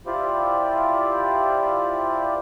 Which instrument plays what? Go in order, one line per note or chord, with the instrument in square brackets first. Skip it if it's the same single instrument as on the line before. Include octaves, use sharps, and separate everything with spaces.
[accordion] E4 F4 G4 C5 D5